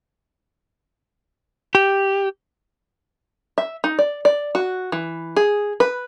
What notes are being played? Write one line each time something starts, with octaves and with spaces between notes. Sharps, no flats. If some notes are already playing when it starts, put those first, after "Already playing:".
G4
E5
D#4
D5
D5
F#4
E3
G#4
B4